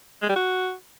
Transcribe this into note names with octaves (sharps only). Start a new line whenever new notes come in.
G#3
G3
F#4